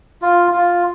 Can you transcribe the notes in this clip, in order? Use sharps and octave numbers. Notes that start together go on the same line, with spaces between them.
F4
F4